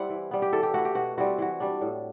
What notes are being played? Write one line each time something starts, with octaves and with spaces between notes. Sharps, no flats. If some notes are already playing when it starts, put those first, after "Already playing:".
Already playing: G3 C4 E4 F#5
E3
G3 B3
G4
E3 A4
G4
A3 E4 F#4
G4
B2 F#4
G3 C4 E4 F#4
E3 F#4
G3 D4
A2